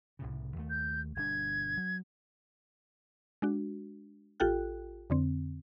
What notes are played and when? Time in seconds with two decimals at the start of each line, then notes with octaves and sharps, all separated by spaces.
0.19 C2 A2 C#3
0.56 D#2 A3
0.70 G6
1.16 G1 B2 D4 G#6
1.77 F#3
3.42 G#3 D4 F#4
4.40 A1 F4 G4 A4 G5 F#6
5.10 F2 D3 C4